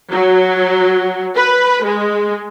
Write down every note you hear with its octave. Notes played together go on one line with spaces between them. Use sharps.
F#3
B4
G#3